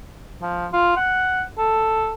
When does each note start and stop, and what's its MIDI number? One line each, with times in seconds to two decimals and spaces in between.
0.42 0.67 53
0.73 0.96 65
0.97 1.43 78
1.58 2.13 69